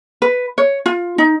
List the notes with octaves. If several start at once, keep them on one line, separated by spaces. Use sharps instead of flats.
B4
C#5
F4
D#4